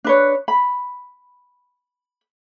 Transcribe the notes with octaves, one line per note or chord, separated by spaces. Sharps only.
D4 B4 C#5
B5